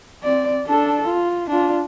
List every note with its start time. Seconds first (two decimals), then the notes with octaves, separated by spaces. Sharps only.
0.23 C4 D5
0.66 D4 A4
1.08 F4
1.49 D4 F4